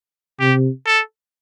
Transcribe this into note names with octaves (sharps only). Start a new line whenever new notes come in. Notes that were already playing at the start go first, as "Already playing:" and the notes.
C3 G4
A4